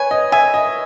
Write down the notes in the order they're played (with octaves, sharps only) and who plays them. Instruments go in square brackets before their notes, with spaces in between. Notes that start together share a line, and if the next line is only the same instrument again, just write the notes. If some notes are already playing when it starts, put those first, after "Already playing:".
Already playing: [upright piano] B4 C#5 [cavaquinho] G#5
[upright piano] D#5
[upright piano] E5 [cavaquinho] G#5
[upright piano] D#5